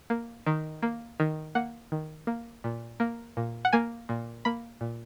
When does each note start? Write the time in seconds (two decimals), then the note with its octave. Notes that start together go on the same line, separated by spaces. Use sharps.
0.10 A#3
0.46 D#3
0.82 A#3
1.20 D#3
1.55 A#3 F#5
1.92 D#3
2.27 A#3
2.64 A#2
3.00 A#3
3.37 A#2
3.65 F#5
3.73 A#3 G#5
4.09 A#2
4.45 A#3 B5
4.81 A#2